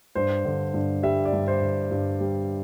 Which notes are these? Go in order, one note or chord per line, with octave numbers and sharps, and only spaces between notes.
G2 C5
D3
G2
G3 E5
D5
G2
C5
D3
G2
G3